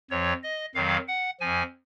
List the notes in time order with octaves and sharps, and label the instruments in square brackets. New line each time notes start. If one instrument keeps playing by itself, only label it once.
[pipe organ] F2 F3 C#5
D#5
F2 D#3 F#3 F5
F#5
F2 F3 G#5